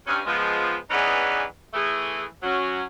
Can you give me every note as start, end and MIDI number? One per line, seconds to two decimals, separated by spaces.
0.06 0.20 43
0.06 0.20 61
0.26 0.76 53
0.26 0.76 56
0.26 0.76 59
0.91 1.43 52
0.91 1.43 59
0.91 1.43 61
0.91 1.43 63
0.91 1.43 68
0.91 1.43 74
1.73 2.24 52
1.73 2.24 57
1.73 2.24 68
2.42 2.82 54
2.42 2.82 61